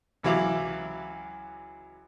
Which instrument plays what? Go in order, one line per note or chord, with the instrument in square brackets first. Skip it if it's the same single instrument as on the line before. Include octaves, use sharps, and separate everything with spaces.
[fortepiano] C#2 E3 F#3 E4 F5 D6